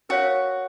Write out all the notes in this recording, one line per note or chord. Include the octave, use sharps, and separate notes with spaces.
F#4 A#4 C#5 F5